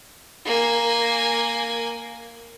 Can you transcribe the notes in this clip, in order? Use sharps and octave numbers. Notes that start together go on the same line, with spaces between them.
A#3 G#5